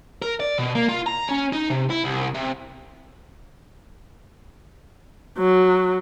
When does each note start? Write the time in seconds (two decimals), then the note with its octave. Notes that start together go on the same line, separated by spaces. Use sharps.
0.22 A#4
0.40 D5
0.58 B2
0.75 A#3
0.89 F4
1.06 A#5
1.29 C#4
1.52 D#4
1.70 C3
1.90 E4
2.04 C2
2.34 C3
5.39 F#3